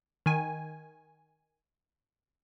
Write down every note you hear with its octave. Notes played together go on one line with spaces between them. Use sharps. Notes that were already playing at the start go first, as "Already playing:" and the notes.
D#3 G#5